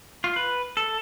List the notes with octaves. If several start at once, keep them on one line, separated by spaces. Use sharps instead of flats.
F4
B4
A4